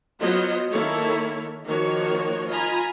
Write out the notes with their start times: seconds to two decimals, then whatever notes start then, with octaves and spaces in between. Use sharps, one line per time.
0.21 F#3 B3 F4 C5 C#5 D#5
0.72 D#3 A#3 E4 A4 C#5
1.66 D#3 F3 A#3 F#4 C#5
2.49 F4 D#5 G#5 A#5 B5